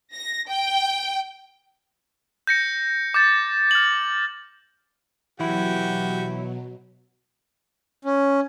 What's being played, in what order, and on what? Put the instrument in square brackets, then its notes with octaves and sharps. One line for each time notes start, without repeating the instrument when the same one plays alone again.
[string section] A#6
G5
[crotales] G6 A#6 C#7
D6 G6 A6
F6 F#7
[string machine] B2 F#3 [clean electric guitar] E3 E4 [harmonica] F#4 G4
[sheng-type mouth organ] C#4